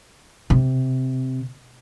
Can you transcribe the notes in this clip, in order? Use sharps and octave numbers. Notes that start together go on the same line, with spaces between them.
C3